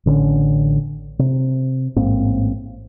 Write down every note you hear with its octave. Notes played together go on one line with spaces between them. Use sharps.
A1 D3 G3 C#4
C3
A1 G#2 A#3 C4